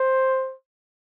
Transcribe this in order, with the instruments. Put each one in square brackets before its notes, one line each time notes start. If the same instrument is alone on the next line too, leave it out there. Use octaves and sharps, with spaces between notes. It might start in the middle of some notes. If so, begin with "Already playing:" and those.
Already playing: [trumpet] C5